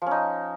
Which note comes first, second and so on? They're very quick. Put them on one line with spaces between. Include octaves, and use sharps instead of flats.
F3 C#4 D#4